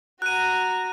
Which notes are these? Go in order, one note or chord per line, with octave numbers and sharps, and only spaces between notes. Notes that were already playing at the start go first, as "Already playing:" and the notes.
F#4 A#5 F#6 D#7